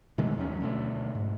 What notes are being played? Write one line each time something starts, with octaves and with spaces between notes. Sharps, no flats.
B2 D#3 G#3 A3
D#2 F#3 C#4
D2 B2 G#3 A3
G#2